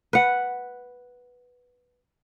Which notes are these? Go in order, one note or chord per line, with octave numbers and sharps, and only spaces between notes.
B4 F#5